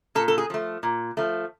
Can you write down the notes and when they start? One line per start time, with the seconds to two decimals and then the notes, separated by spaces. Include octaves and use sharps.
0.15 A#2 A4
0.28 A4
0.38 G#4
0.50 F3 A3
0.83 A#2
1.17 F3 A3